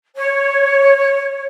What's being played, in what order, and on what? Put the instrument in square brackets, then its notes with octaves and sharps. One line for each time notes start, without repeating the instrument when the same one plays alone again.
[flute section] C#5